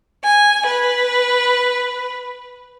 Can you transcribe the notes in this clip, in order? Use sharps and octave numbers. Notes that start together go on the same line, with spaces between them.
G#5
B4